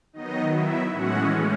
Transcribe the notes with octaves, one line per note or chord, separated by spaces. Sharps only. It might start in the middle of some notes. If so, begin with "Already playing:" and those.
D#3 F#3 B3 D#4 D#5
E4 E5
A2 E3 G#3 C#4 F#4 F#5